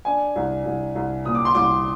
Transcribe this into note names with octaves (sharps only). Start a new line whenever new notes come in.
D4 G#5
C2
C2
C2
A#2 D#6
D6
C6
C2 D6